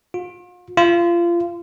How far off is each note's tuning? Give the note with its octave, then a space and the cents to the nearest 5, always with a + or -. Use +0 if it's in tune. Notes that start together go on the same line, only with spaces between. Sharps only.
F4 +40
F4 -25